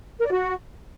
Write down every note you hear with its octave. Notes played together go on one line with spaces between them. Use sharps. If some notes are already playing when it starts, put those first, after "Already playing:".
A#4
D5
F#4